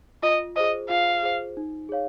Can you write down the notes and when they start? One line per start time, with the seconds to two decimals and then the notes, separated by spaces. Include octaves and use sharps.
0.23 F4 D#5
0.56 G#4 C5 D#5
0.89 F4 F5
1.23 G#4 C5
1.57 D#4
1.89 G#4 C#5 F5